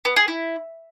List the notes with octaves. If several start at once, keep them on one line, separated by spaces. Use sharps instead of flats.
B3
G#4
E4